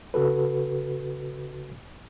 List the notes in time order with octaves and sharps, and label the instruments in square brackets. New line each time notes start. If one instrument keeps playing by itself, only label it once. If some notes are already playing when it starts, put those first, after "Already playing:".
[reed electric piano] C#3 F#4 A4 B4